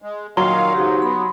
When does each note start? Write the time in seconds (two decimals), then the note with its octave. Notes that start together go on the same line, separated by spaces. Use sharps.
0.02 G#3
0.37 A#2 D#3 F#3 F5 C6
0.74 G#2 C#3 D#4 F#4 G4
1.02 B3 B5